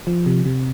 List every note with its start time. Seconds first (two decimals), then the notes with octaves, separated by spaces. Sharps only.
0.07 F3
0.26 C3
0.45 C3